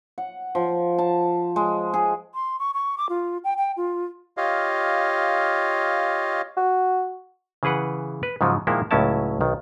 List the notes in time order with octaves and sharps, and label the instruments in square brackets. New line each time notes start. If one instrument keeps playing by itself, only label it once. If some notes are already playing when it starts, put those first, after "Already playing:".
[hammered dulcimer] F#5
F3
A5
G#3
G#4
[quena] C6
C#6
C#6
D6
F4
G5
G5
F4
[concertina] F4 G4 C#5 D#5 F5
[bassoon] F#4
[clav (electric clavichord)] C#3 E3 G#4 B4 F#5
B4
G#2 C#3 F3 F#3
A#2 D#3 F3 G#3 A#3 E4
C#2 A2 F#3 C#4 E4 A5
B1 D#3